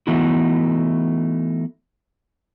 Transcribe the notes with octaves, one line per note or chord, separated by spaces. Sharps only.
E3 A3 B3 D#4 E4 F#4